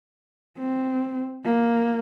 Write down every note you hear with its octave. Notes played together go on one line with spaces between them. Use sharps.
C4
A#3